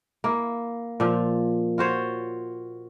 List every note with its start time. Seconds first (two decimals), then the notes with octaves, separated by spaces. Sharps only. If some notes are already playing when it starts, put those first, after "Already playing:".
0.24 A#3 E4
1.00 A#2 F3
1.78 F4 F#4 C5 C#5